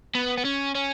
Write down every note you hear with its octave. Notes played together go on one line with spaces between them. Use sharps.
B3
B3
C#4
C#4